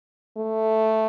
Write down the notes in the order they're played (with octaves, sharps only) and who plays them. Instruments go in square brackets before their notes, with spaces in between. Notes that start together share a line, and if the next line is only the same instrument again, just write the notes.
[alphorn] A3